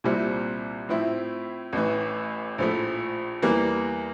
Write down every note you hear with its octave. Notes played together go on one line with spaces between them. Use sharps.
C2 A#2 G3 C4 E4
A2 F3 C4 E4
A1 A2 E3
A#1 A2 F3 A3
E2 E3 G3 A#3